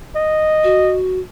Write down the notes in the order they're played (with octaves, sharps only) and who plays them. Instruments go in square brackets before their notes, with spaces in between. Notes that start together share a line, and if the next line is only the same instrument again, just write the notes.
[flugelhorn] D#5
[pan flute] F#4